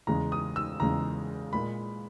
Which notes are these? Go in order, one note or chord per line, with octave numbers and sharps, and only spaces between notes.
E2 C#3 G#3 A#5
D#6
E6
E2 C#3 G#3 A#5
A#2 G#3 B5